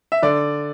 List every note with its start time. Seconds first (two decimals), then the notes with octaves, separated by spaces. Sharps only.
0.12 E5
0.22 D3 D5